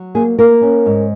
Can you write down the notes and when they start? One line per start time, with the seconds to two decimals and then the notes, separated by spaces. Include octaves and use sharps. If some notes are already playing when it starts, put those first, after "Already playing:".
Already playing: F#3
0.15 A#3 G#4
0.39 A#3 A#4
0.62 C#4
0.86 G#2